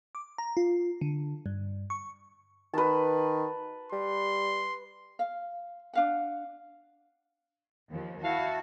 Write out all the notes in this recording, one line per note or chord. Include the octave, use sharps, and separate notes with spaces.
D6
A#5
F4
D3
G2
C#6
D#3 B4 A5
G3 C6
F5
D4 F5 F#5
D#2 F3
E4 F#4 F5 A5